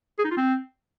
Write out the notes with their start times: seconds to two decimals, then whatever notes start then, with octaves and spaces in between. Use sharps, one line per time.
0.19 G#4
0.25 D#4
0.31 F4
0.37 C4